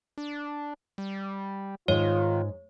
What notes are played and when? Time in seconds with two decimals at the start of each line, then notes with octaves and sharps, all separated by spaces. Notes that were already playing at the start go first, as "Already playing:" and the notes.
0.18 D4
0.98 G3
1.88 G#2 D#3 F4 C#5